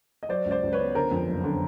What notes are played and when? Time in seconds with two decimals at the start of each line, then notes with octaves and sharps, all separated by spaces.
0.23 D#5
0.29 F#3 C5 D5
0.45 C#2
0.51 C5 D5
0.63 C#2
0.73 B4 C#5
0.79 B3
0.95 D3 A#4 C5
1.11 F2
1.28 F#1
1.44 D3